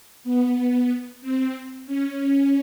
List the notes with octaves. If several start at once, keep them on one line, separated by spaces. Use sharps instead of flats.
B3
C4
C#4